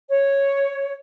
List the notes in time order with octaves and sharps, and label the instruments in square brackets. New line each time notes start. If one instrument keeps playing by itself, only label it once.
[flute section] C#5